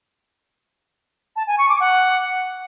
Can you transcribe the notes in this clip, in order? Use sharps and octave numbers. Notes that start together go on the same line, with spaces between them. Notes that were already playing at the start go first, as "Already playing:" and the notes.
A5
G#5
C#6
D6
F#5